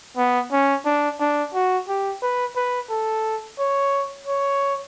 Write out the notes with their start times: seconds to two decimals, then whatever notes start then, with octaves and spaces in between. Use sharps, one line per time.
0.17 B3
0.52 C#4
0.85 D4
1.20 D4
1.54 F#4
1.88 G4
2.22 B4
2.56 B4
2.90 A4
3.59 C#5
4.27 C#5